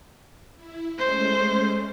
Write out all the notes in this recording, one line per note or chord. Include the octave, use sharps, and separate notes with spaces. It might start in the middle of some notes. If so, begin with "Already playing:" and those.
E4
G#3 A3 C#4 C5